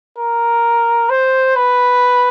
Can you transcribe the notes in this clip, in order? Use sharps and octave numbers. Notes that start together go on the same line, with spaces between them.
A#4
C5
B4